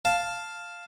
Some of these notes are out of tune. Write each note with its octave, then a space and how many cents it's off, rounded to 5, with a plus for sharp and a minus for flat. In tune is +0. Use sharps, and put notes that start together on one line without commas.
F5 +0 A5 +0